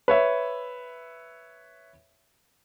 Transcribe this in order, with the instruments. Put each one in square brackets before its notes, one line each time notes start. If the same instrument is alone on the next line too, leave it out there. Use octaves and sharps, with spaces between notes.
[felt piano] B4 C#5 E5